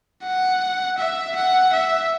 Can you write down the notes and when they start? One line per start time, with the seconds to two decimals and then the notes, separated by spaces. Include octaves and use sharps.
0.23 F#5
0.98 E5
1.35 F#5
1.73 E5